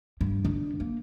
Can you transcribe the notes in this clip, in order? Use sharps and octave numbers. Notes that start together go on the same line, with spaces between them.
G2
D3
A#3